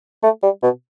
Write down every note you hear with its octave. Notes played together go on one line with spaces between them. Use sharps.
A3
G3
B2